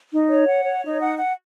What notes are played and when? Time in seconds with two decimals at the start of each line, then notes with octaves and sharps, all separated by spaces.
0.11 D#4
0.30 C#5
0.47 F#5
0.65 C#5
0.84 D#4
1.01 F#5
1.19 F#5